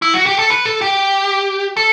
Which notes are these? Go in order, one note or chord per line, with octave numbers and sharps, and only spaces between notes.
E4
F#4
G4
A4
B4
A4
G4
A4